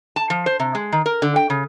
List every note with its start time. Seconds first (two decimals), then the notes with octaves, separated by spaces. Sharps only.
0.16 A5
0.30 F3
0.46 C5
0.60 C3
0.75 G#3
0.92 D#3
1.06 A#4
1.22 D3
1.36 G5
1.50 C#3